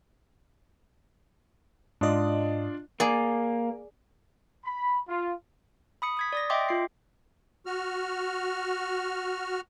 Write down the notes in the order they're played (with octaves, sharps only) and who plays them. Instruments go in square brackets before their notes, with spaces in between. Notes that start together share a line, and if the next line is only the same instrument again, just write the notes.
[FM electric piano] G#2 D#5 [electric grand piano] D4 F4 D5
[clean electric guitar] A#3 [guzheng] G#4 D5
[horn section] B5
F4
[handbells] B5 D#6 C#7
D#6 G#6 B6
D5 D#6 A#6
D#5 E5 G5 C6 D6
F4 C7
[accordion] F#4 F6